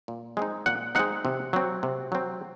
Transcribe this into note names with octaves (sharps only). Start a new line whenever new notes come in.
A#2
G#3 C4 D#4
A#2 F#5
G#3 C4 D#4 F#5
C3
F#3 C4
C3
F#3 C4